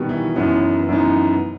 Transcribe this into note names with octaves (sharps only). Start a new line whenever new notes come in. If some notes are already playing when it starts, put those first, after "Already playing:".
Already playing: B2 D#3 G3 B3 F#4
E3
F#2 E3 F#3 B3 D#4
F#2 E3 B3 D#4